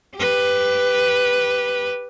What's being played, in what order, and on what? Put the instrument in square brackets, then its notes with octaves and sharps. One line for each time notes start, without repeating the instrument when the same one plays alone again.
[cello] G4 B4